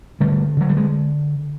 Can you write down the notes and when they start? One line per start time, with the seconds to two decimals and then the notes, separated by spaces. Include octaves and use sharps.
0.20 D3 G3 A3
0.57 D3 F#3
0.69 G3
0.77 G#3